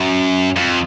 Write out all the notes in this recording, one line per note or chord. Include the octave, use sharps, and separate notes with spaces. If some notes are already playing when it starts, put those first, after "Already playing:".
Already playing: F#2
F2